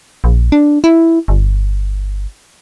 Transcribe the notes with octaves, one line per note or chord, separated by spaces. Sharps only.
A#1
D4
E4
G1